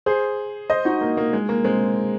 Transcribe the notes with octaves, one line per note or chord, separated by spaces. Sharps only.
G#4 C5
C5 D#5
D#4 F#4
A#3
A#3
G#3
A#3
G#3 C4